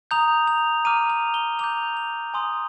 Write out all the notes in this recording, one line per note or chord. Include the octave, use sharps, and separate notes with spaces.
A#5 D#6 G6 F7
F7
A#5 D6 F6 D#7
F7
G7
A#5 D6 G6 F7
F7
G#5 C6 D#6